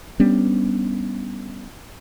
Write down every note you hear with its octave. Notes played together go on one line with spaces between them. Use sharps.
G3 B3 C#4 D4